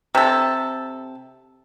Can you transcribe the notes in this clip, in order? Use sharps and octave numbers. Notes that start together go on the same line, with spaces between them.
C3 A4